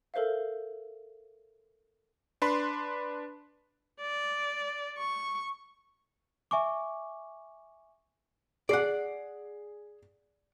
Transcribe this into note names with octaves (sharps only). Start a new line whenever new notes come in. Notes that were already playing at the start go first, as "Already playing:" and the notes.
A4 A#4 C5 E5 F5
D4 B4 B5 C6
D5
C#6
E5 G#5 C#6 D6
G#4 D5 F#5 C7